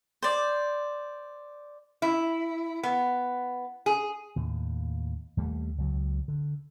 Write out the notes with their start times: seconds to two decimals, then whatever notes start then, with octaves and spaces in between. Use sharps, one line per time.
0.23 C5 D5
2.02 E4
2.83 B3
3.86 G#4
4.36 D#2 A2
5.37 D#2 G3 A3
5.78 C#2 F#3
6.28 D3